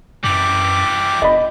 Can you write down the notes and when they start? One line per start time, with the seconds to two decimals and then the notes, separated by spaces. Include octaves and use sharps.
0.24 F#2 E3 G3 D6
1.22 D#1 D#5 B5